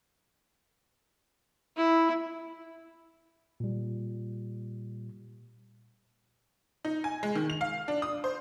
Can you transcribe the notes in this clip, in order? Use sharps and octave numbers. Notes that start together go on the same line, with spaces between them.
E4
A#2 G3
D#4
G#5
G#3
D#3
F7
F5
D4
D#6
C5